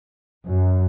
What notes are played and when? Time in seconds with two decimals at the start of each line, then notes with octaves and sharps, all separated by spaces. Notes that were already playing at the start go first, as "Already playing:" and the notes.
0.47 F#2